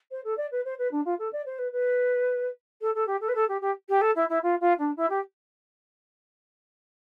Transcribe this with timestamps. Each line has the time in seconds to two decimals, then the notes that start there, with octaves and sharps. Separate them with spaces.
0.11 C5
0.24 A4
0.37 D5
0.51 B4
0.64 C5
0.78 B4
0.91 D4
1.05 F4
1.18 A4
1.32 D5
1.45 C5
1.58 B4
1.72 B4
2.81 A4
2.94 A4
3.06 G4
3.20 A4
3.28 B4
3.34 A4
3.48 G4
3.61 G4
3.88 G4
4.01 A4
4.15 E4
4.29 E4
4.42 F4
4.60 F4
4.78 D4
4.96 E4
5.09 G4